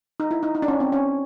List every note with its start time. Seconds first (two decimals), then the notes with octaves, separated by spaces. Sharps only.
0.20 D#4
0.31 E4
0.43 D#4
0.55 D#4
0.62 D4
0.68 C#4
0.80 C4
0.92 C#4